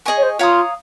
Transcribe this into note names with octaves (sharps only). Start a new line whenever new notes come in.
G#4 D#5 G#5 C#6
C#5
C5
F4 C#5 F5 A#5 D#6